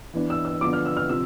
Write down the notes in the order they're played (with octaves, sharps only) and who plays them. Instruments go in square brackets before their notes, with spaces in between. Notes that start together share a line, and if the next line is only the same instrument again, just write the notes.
[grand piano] E3 B3 D4
E6
E6
D3 F3 B3 D6
F6
E6
F6
C3 F3 C4 E6